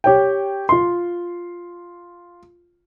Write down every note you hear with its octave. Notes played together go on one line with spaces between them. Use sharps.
G4 C#5 G5
F4 C6